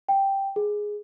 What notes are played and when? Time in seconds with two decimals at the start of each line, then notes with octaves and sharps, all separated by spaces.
0.09 G5
0.56 G#4